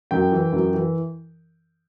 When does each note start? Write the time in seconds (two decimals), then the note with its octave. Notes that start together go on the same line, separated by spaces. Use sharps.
0.11 F#2 G5
0.32 E3
0.52 F#2
0.74 E3